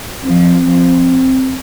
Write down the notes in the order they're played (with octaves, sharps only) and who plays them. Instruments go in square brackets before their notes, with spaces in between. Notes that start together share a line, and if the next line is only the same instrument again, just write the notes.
[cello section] F3 [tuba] C4
[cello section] F3